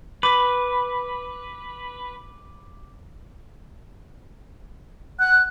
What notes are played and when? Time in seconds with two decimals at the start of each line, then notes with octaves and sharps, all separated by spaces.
0.23 B4 D6
5.20 F#5 F#6